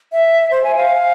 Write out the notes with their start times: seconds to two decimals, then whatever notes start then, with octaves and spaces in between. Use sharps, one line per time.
0.12 E5
0.51 C5
0.64 G#5
0.76 F5